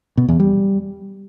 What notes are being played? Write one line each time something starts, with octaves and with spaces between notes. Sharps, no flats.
B2
E2
G3